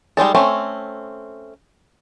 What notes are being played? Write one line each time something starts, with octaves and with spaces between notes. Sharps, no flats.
G3 G#3 D#4 A4
A3 C4 C#4